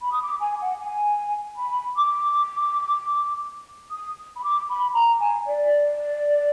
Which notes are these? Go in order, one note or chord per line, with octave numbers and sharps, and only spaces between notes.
B5
D#6
D6
G#5
F#5
G#5
B5
D6
D#6
B5
D6
B5
A#5
G#5
D5